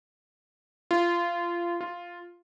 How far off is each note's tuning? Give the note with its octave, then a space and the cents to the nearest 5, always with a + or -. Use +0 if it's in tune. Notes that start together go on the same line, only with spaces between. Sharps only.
F4 -20
F4 +0